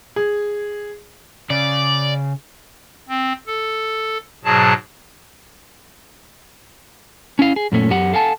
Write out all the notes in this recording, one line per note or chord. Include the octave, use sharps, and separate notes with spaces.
G#4
C#3 D5
C4
A4
G#2 B2 F#3 G#4 A5
C#4 E4 F5
G#4
F#2 A#2 A3 C#4
F#2 G4 F#5
A4 F5 F#5 G#5 A5